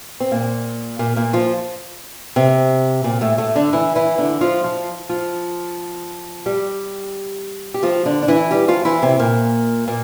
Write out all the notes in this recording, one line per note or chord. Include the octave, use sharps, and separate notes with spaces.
C4
A#2 A#3
A#2 A#3
A#2 A#3
F3 F4
C3 C4
A#2 A#3
A2 A3
A2 A3
D3 D4
E3 E4
E3 E4
D3 D4
F3 F4
F3 F4
F3 F4
G3 G4
G4
F3 F4
D3 D4
D4
E3 E4
G3 G4
F3 F4
E3 E4
C3 C4
A#2 A#3
A#2 A#3